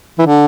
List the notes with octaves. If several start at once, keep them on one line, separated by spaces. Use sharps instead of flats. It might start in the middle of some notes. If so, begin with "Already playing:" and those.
E3
D3